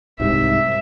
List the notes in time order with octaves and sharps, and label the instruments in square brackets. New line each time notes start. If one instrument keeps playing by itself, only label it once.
[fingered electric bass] C2 G#2 C3 [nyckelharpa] E5